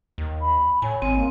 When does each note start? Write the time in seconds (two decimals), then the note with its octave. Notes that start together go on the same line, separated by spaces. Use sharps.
0.18 D#2
0.41 B5
0.82 A2 C#5 G#5
1.02 G#1 C4
1.16 A#3 C4